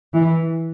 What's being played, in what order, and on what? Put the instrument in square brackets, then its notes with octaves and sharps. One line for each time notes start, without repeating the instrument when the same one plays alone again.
[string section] E3